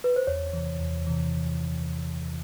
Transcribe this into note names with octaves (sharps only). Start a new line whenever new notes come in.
B4
C5
E2 C#5
C3 E3
E2
C3 E3